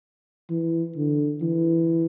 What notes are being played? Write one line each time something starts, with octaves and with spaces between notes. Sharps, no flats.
E3
D3
E3